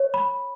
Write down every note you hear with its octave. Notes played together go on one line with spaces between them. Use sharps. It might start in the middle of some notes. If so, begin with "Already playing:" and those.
Already playing: C#5
B5